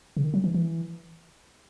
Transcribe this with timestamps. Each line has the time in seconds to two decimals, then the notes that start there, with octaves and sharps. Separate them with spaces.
0.17 C#3
0.24 D#3
0.34 F#3
0.44 E3
0.54 E3